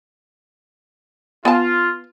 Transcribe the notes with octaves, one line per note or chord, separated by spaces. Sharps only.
B3 F4 G#5 A5